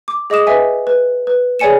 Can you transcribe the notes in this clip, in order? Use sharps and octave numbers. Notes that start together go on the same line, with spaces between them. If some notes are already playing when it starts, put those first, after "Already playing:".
D6
G#4 D#5 D6 D#6 E7
B4 D#5 E5 G#5
B4
B4
G#4 C#5 D5 G#5 C#7 E7